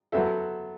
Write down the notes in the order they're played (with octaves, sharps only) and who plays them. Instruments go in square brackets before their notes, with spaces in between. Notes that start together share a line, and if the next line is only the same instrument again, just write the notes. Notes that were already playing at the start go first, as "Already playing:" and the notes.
[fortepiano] F#3 B3 F#4 C5 E5 [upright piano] A4